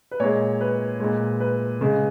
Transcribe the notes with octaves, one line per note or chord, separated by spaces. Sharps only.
B4
A#2 G#3 C#5
B4
A#2 G#3
B4
C#3 G#3